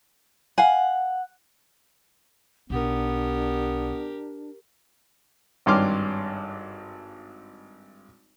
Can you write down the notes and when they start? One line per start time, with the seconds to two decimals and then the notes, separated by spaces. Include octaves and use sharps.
0.58 F5 F#5 G#5
2.70 B1 B3 D4 G4 A#4
5.66 G#1 G2 C#5 C6 D6 F6